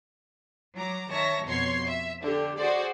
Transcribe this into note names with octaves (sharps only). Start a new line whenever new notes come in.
F#3 A#5 D6
D#3 C#5 E5 A5 A#6
F2 B2 C#5 C6 C7
E5
D3 D4 G4
F#4 G#4 C5 D5